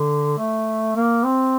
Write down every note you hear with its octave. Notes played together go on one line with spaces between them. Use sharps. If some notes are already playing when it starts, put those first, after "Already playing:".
Already playing: D3
A3
A#3
C4